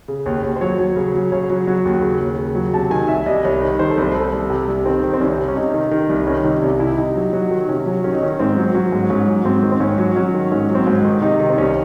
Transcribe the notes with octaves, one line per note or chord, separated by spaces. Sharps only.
C#3
D#2 C#5
D#2
C5
F#3 C#5
F#3
C#3
F#3
C#3 C#5
F#3
F#3
D#2
C#3
D#2
C#3
F#3
C3 A5
D#3 G#5
C2 E5
C2 D#5
C2 C#5
D#3
D#3 C5
A4
C2 C5
C2 A4
C2
C3
C2
D#3 C4
D#3
C4
C2 C#4
C3
C#4
C3 D#4
D#3
D#3
C2
D#3 C#4
C3 D#4
C2
C3 E4
C3 D#4
F#3
F#3
D#3
C3 C#4
F#3
D#3 C#4
D#4
D#3 C#4
G#2 C4
F#3
F#3 C#4
G#2
G#2 C#4
F#3
G#2 C4
D#3
C4
G#2 C#4
F#3
F#3 C#4
D#3
G#2 C#4
F#3
C4
G#2
D#3 D#4
C3 D#4
D#3 D#4
C4
C2 C#4